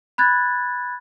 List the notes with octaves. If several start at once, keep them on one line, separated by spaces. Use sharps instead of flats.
B5 F#6 G#6 A6